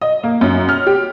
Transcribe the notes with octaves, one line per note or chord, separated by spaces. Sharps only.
D#5
A#3
F#2
F6
G4